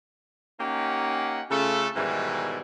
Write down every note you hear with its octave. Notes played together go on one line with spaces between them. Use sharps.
A#3 C#4 D#4 G4 F#5 G#5
C#3 A3 F4 A4
G#2 B2 D#3 E3 G3